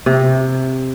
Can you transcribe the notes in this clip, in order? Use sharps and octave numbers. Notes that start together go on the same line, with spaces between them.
C3